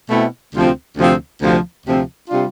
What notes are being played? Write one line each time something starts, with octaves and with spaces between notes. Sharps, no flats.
B2 A3 C4 E4
D2 C3 F3 C4
D2 C3 F3 C4
D2 C3 F3 C4
D2 C3 F3 C4
C3 G3 D4 F4